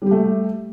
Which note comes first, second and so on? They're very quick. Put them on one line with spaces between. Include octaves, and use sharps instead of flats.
G3 G4 A3